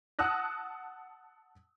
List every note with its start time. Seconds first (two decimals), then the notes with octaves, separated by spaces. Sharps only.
0.19 F#5 A5 D#6 E6 F#6 A#6